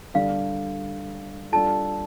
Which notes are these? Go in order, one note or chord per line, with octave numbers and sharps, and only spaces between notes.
D3 G3 D4 G4 D5 F5
G3 D4 F4 A4 A5